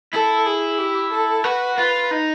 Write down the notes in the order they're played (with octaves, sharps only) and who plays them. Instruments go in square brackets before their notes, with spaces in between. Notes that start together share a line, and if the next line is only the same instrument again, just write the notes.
[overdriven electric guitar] E4 [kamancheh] A4
[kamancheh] G#4
G4
A4
[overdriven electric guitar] F#4 [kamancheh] B4
[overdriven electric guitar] F4 [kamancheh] B4
[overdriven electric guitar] D#4